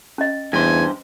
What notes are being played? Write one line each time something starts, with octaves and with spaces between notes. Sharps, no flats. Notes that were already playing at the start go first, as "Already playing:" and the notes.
C#4 D#5
E2 G2 C5 G#5